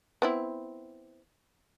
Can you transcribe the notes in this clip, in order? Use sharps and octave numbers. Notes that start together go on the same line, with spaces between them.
B3 C4 E4